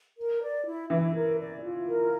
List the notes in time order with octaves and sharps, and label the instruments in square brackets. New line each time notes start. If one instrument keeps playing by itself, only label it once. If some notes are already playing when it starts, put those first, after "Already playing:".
[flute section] A#4
D5
E4
[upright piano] E3 [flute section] E4
[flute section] A#4
D5
F4
A#4